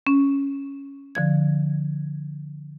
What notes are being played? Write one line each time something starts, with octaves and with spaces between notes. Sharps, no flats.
C#4
D3 F3 G#6